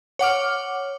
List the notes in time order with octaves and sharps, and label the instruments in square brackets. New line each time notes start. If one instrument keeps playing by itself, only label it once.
[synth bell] C#5 F#5 D6 F6